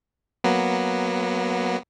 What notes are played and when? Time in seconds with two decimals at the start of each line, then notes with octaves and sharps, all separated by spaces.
0.44 F#3 A#3 B3